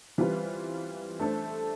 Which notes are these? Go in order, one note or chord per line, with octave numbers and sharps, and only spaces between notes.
E3 G3 C4 F4 B4
A3 D4 A4 C5